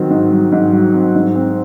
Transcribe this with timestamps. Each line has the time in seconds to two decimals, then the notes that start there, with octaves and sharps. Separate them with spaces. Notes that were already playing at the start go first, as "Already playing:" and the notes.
Already playing: D#3 F#3 C4
0.10 G#2
0.31 F#3
0.52 G#2
0.73 F#3
0.94 C4
1.15 G#2
1.35 C4